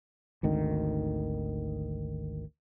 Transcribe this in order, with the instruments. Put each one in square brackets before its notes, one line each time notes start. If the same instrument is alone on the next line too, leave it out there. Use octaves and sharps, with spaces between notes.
[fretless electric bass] G#1 D2 D#3